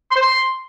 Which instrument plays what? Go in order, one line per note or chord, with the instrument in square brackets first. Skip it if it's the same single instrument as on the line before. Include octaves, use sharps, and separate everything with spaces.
[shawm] C6
C5
C6